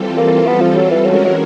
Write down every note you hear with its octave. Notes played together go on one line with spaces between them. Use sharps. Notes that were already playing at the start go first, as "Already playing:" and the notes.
Already playing: E3 G3 C4 F4 A4
A#3
B3
F3
F#3
E3
E3 F#3 G#3 C#4 F#4 A#4
F#3